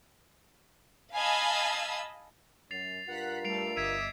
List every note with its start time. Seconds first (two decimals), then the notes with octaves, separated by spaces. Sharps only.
1.14 D#5 F5 G#5 A5 B5 E6
2.71 F#2 A6 C7 F7
3.07 G2 F4 A#4 F#5 F#6 B6
3.45 G3 A3 A4 C7 D7 F7
3.77 G1 D#5 E5 D6 G#6 D7 D#7